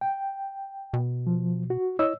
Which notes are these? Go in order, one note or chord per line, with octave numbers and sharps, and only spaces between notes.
G5
B2
F3
F#4
E4 C#5 D#5 E6